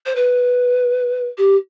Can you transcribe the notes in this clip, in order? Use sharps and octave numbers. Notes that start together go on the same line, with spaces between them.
C5
B4
G4